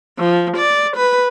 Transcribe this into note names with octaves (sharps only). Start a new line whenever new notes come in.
F3
D5
B4